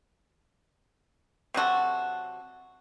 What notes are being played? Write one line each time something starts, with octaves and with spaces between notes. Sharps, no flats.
C3 F#3 F#4 A4